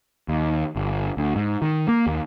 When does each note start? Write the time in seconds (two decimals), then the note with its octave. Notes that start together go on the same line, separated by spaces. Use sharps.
0.28 D#2
0.76 G1
1.17 D2
1.36 G#2
1.62 D#3
1.88 A#3
2.07 D#2